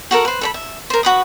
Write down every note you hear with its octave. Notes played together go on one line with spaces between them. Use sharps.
F#4 A4 A#4 F#5
B4 C5
A4 D5 B5
E5
A#4 C5
F#4 B4 D#6